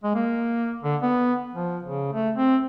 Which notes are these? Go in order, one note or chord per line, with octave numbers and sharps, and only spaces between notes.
G#3
A#3
D3
B3
F3
C#3
A3
C4